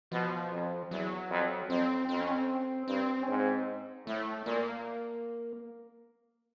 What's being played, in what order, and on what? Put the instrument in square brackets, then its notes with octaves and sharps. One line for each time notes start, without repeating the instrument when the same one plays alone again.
[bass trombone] B2 [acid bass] F3
[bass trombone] F2
[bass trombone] E2 [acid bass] F#3
[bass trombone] F2
[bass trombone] F2 [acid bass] C4
[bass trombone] F2 [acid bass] C4
[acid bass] C#4
C4
[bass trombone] G2 [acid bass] C4
[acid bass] C#4
[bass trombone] G#2 [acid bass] C4
[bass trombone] A2 [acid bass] A3
[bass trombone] A#2 [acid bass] A#3